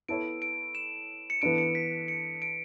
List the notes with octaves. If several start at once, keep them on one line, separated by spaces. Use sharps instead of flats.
B3 E4 A4 C#5 D7
D7
E7
C#7
E3 B3 D4 A4 D7
C#7
B6
C#7
D7